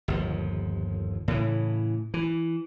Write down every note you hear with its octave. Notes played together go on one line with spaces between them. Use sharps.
G1 D#2 F3
A2 C#3 E3
E3